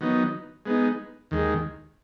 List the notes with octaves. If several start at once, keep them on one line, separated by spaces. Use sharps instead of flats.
D#3 F#3 B3 D#4
G#3 B3 D#4
D#2 D#3 G#3